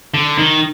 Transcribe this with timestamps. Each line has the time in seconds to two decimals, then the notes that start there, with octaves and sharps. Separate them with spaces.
0.14 D3
0.38 D#3